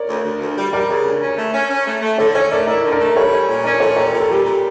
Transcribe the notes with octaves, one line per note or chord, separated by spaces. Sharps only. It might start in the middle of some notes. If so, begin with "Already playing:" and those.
Already playing: A#4 C#5 D5
D2
D2
D2
G3
G3 A#4 D5
C#3
D2
C#4
A3
C#4
C#4
A3
A3
D3 A4 C#5
C#4 A4 C#5
A3 A#4 D5
E4 A#4 D5
D3
A#4 D5
A3
G3 A4 C#5
C#4
A#2
C#4 A#4 D5
A#2 A4 C#5
G3 C#5
A#2 A#4
A4
G3 G4 A#4
A#2